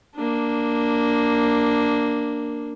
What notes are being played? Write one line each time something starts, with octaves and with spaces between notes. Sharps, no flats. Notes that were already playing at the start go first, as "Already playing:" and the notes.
A#3 D4